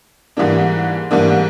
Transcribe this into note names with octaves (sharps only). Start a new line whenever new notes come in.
G#2 E3 G3 A#3 D4
G#2 E3 G3 A#3 D4